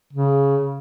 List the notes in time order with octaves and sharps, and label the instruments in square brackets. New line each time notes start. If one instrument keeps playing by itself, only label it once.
[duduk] C#3